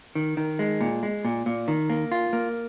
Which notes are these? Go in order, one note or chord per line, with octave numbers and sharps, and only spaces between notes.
D#3
D#3
G#3
A#2
G#3
A#2
A#2
D#3
A#3
F4
A#3